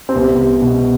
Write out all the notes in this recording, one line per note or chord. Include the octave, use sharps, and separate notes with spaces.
C4
C2 B3
C2
B2